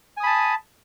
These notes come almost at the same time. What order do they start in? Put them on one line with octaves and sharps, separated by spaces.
G#5 D#6 B5 A5